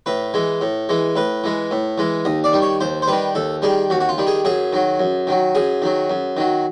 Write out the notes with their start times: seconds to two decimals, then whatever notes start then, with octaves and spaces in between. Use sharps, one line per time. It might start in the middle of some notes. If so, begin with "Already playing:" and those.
0.06 A2 B4
0.34 E3 G#3
0.61 A2
0.89 E3 G#3
1.16 A2 B4
1.44 E3 G#3
1.71 A2
1.98 E3 G#3
2.25 D#2 D#5
2.44 D5
2.53 D#3 G3
2.62 C#5
2.81 D#2 C5
3.02 C5
3.08 D#3 G3 B4
3.35 D#2 A4
3.62 D#3 G3 G#4
3.90 D#2 F#4
4.00 F#4
4.09 F4
4.18 D#3 G3
4.27 G#4
4.45 F#2 G#4
4.73 D#3 F#3
5.00 F#2
5.27 D#3 F#3
5.55 F#2 G#4
5.82 D#3 F#3
6.10 F#2
6.37 D#3 F#3